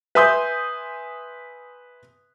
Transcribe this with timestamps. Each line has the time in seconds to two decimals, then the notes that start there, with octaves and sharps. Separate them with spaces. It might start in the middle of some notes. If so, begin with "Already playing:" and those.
0.15 B4 E5 G#5 C6 D#6 G6